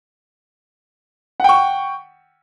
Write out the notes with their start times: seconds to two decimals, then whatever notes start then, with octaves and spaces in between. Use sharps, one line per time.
1.40 F#5
1.44 G5
1.49 C#6